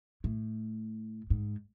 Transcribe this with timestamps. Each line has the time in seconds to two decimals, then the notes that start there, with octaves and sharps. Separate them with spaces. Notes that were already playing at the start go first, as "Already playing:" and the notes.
0.24 A2
1.30 G#2